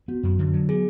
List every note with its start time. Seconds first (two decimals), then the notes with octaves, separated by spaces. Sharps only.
0.08 B3 F#4
0.23 F#2
0.39 D3
0.54 F#3
0.69 B3 G#4